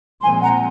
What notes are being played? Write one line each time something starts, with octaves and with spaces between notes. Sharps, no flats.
A#2 F3 G#3 C4 G#5 C6
F#5 A#5